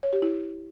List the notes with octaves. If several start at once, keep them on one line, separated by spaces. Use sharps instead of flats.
C#5
G4
E4